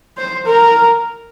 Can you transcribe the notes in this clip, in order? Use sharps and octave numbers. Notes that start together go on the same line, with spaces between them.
C5
A#4